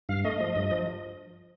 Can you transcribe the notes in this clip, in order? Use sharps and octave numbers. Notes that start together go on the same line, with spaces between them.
G2 F5
A3 D#5
F3
G2
F3